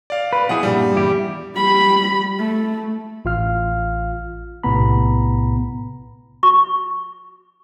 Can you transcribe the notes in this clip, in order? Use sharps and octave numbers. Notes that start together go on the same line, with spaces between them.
D5 F5
B4
B2 F3 E4 G#4 F#5
G2 A#2 G3
E2 E4 G4
G3 B5
A3
A1 F4 F5 F6
B1 A2 C3 B3 A#5 B5
C#6